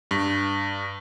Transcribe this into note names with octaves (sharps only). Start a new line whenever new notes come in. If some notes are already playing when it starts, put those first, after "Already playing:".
G2